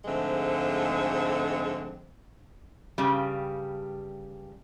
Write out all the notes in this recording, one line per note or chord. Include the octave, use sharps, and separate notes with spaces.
G#2 D3 F3 G#3 A3 C4
G2 C#3 G3